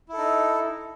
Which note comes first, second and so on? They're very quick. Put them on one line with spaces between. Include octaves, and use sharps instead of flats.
E4 A4 D#4